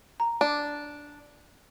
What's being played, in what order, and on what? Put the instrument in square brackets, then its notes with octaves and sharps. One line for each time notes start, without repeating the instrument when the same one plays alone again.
[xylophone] A#5
[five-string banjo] D4